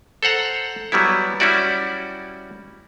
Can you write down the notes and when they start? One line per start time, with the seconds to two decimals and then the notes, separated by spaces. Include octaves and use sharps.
0.23 A4 C5 F#5 A#5
0.92 F#3 G3 B3 E4
1.40 G3 C#4 E4 F#4 D5